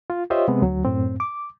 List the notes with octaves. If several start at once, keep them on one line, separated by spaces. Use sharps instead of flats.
F4
F4 G4 C5 C#5 D#5 E5
C3 G#3 B3 C4
D2 F#3
F#2 A2 C4
D6